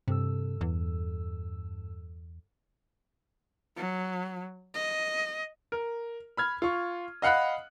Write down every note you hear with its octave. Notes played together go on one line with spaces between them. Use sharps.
G2 C3 A4 E6
E2
F#3
D#5
A#4
B5 F6 G#6
F4 C#6
D#5 F5 F#5 B5 F#6